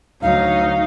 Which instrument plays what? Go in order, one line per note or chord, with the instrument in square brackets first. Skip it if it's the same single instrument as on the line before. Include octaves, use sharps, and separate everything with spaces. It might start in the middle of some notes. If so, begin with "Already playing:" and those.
[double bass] D2 F#3 [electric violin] D#4 [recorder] F5